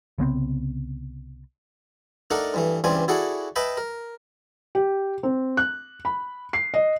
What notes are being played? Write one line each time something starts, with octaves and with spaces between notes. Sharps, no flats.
C2 C#3 B3 C4
A3 D4 D#4 A4 A#4 F#5
G2 E3 A3
C#2 G2 E3 C4 D5 G#5
E4 F#4 G#4 A4 D5 F#5
B4 D#5 E5 G5 A5 B5
A#4
G4
C4
F#6
B5
C7
D#5